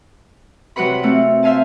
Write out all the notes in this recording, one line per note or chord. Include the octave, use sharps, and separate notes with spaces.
C3 F#3 F#4 B4 F#5 B5
A3 C4 F4 F#4
C5 E5 F5 G#5 A5